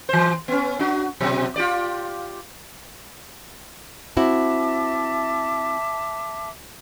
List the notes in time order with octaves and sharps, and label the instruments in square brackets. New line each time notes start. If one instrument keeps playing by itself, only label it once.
[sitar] E3 C5
B3 C#4
D4 F#4
B2 F#3 C4
F4 G4 D5
[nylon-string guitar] C4 E4 F#4 [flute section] E5 A5 D6